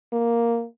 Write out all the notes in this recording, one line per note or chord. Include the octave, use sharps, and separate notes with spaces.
A#3